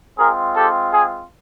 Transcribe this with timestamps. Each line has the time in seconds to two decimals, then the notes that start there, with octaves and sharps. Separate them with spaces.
0.18 G#3 C4 F4 G#4 A#4
0.56 G4 A4
0.92 G#4